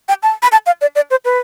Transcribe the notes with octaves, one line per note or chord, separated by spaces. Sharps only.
G5
A5
B5
A5
F5
D5
D5
C5
B4